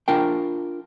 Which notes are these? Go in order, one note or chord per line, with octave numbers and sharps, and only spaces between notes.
D4 F4 A#4 G5